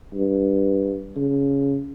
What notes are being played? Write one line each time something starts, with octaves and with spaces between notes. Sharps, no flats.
G2
C#3